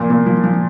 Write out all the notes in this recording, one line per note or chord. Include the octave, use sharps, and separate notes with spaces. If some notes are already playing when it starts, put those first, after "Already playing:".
Already playing: A#2 F3 C6
A#2
F3
F3